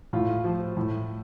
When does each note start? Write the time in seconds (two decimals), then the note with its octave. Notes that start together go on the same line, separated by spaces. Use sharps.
0.13 A2 F4
0.44 F3
0.77 A2